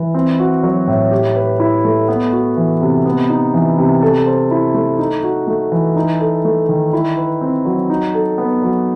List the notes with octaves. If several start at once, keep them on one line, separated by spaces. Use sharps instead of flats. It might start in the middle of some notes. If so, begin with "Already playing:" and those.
Already playing: E3
C4
F#4
F#3
A2
G4
B4
E4
A3
B3
F#4
E3
C3
B3
D#4
E3
C3
A4
C5
E4
A3
D#4
F#4
A3
E3
D#4
A4
A3
D#3
E4
B4
C4
F#3
D#4
A4
B3
F#3